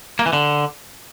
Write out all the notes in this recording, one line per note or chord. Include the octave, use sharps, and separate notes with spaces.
A#3
E3
D3